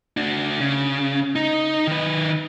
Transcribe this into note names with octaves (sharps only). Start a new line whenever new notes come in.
D4 F#4
C#3
D#4
D#3 B4